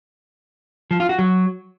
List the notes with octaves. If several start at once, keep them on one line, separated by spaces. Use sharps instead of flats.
F3
F4
F#4
F#3